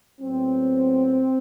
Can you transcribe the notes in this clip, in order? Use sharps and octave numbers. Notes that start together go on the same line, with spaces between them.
A2 F#3 B3 C4